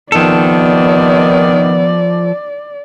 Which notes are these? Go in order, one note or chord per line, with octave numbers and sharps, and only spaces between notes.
C3 D#3 F3 B3 A4 D5